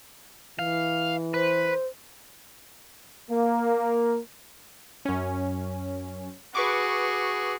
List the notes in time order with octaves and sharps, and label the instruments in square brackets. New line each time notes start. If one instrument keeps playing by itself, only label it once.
[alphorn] E3 [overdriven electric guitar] F5
[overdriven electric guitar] B4 [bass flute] C5
[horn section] A#3
[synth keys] F#2 C#4
[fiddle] F#4 G#4 [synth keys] B4 C#6 D6